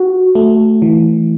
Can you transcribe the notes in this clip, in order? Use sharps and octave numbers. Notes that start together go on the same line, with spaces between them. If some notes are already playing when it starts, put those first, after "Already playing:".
Already playing: F#4
A3
E3